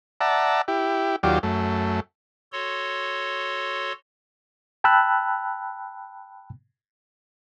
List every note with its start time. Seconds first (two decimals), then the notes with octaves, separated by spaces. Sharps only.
0.21 D5 E5 F#5 A5 A#5
0.68 E4 G4
1.23 D#2 F#3 F4 G4 D5
1.43 F#2 A3
2.52 F#4 A4 C#5 C6
4.84 G5 A5 B5 E6 F#6